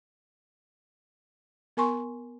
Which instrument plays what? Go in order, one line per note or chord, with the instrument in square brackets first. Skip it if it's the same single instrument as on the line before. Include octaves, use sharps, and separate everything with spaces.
[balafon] B3 A#4 G#5 C6 C#6